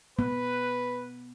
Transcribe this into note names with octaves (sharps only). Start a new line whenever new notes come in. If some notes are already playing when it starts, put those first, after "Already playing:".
B3 B4